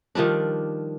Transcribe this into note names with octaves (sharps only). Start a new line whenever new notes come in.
D#3 F3 G3 D4